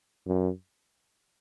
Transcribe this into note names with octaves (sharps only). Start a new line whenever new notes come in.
F#2